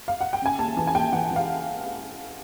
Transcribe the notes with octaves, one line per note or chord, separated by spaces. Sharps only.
F5
F#5
G5
C#3 G#5
D#2 A5
E3 A5
G#5
D#2 G5
E3 F#5
E3
F5